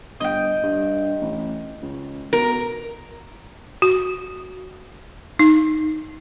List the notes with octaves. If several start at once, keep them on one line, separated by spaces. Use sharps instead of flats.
G1 D#5 G5
G2
A1
C#2
B2 A#4
F#4
D#4